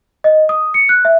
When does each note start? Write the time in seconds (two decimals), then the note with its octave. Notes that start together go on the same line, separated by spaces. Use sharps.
0.24 D#5
0.49 D#6
0.74 C#7
0.89 F#6
1.05 E5